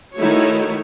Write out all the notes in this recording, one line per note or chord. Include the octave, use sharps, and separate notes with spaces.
D#3 A3 D#4 E4 F#4 C#5